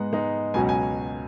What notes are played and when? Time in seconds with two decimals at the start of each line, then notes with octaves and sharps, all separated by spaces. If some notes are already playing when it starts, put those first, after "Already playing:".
Already playing: G#2 G#3 B3 D#4 F#5
0.13 G#2 G#3 B3 D#4
0.54 C#2 B2 F#3 C#4 G#5
0.69 G#5